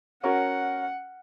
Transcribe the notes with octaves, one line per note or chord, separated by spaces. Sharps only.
C#4 F#4 A#4 F#5